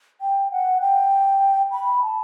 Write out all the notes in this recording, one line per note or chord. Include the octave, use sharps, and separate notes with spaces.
G5
F#5
G5
B5
A5